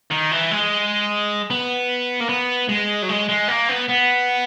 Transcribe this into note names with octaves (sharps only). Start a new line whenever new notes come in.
D#3
E3
G#3
B3
A#3
B3
G#3
F#3
G#3
G#3
A#3
B3
B3